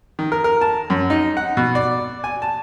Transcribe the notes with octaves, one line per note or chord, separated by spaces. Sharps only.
D#3
A#4
A#4
A5
F#2
D#4
F#5
B2
D5
G#5
A5